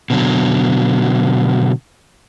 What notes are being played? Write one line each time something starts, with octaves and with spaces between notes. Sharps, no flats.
B2 D3 F#3